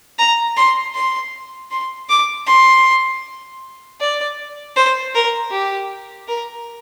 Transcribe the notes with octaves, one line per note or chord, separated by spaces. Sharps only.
A#5
C6
C6
C6
D6
C6
D5
C5
A#4
G4
A#4